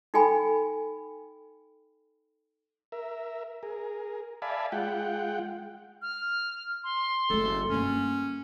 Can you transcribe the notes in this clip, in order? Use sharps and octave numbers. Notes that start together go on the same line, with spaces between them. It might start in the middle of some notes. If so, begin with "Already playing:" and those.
D#4 A4 G5 G#5 B5
A#4 E5
G#4 A#4
D5 E5 F5 G#5 A5 B5
G#3 F4 F#5 G5
F6
C6
F#1 A3 A4
G2 A#3 C#4